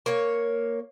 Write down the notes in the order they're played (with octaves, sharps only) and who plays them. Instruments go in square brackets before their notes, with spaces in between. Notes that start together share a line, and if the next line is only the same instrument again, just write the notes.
[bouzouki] A#3 C#5